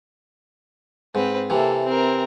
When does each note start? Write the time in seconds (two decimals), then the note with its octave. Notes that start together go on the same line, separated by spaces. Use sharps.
1.15 G#2 C4 B4
1.50 C3 E3 A#3 A4
1.85 C4 A#4